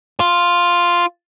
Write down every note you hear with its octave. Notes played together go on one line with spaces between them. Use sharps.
F4